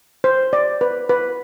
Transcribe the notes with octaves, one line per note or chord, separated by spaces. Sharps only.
C5
D5
B4
B4